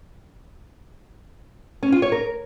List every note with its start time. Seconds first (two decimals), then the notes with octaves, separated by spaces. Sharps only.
1.83 C#4
1.92 F4
2.02 C#5
2.12 A#4